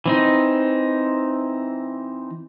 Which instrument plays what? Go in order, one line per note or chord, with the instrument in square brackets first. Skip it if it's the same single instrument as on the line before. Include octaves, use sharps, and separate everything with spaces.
[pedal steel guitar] E3 C4 D#4